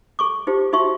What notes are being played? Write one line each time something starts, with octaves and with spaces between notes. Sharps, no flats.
A4 C#6 D6
D#4 F4 G4 C5
D#4 F4 F#4 E5 C6 C#6